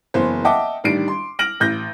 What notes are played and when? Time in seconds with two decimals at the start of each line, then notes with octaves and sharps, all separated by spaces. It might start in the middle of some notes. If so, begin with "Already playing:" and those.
0.14 F#1 E3 B3 C5
0.45 D#5 E5 F#5 G5 A5 D6
0.84 A1 D#3 G3 D4 C7 D7
1.08 C6
1.39 F6 A#6 D7 F#7
1.60 A1 G6 A#6